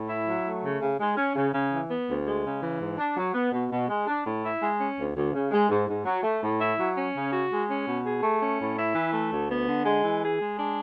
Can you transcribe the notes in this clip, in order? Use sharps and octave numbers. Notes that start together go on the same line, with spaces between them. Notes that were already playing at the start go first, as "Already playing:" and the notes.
Already playing: A2
E4
F#3
A3
C#3
C#3
G#3
C#4
C#3
C#3
E3
B3
D2
G#3
C#3
E3
G#2
D4
F#3
B3
B2
B2
G#3
D4
A2
E4
G#3
C#4
D2
D2
C#3
G#3
G#2
G#2
F#3
A3
A2
E4
F#3
C#4
C#3
F#4
G#3
C#4
B2
G#4
A3
C#4
A2
E4
E3
A3
D2
B3
D3
G#3
E3
G#4
G#3
D4